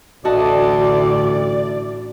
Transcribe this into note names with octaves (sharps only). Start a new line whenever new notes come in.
A1 D2 A2 D3 F#4 D5 D#5 A5